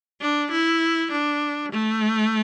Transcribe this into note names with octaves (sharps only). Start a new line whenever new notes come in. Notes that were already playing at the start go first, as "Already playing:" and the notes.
D4
E4
D4
A3